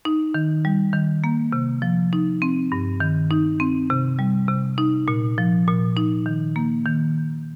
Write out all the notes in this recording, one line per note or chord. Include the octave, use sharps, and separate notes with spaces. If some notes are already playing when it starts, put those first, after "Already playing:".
D#4
D#3
G3
D#3
A#3
C3
F3
D#4
C4
G2
D#3
D#4
C4
C3
G3
C3
D#4
A#2
F3
A#2
D#4
D#3
A#3
D#3